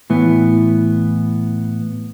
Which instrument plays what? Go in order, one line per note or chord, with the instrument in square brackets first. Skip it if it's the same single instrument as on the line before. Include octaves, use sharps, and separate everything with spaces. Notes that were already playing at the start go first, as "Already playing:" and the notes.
[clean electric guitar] A2 E3 B3